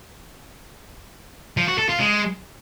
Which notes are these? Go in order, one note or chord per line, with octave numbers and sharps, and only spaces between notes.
F3
F#4
A4
F4
G#3